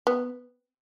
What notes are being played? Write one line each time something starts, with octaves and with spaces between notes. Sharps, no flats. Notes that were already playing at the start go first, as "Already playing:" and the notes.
B3